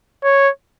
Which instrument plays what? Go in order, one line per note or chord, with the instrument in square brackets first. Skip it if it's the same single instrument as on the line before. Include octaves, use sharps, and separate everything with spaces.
[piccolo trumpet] C#5